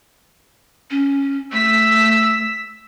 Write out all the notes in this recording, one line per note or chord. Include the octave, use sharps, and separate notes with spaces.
C#4
A3 E6 B6